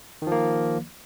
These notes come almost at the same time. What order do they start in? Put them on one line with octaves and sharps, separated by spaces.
D#3 F3 A#3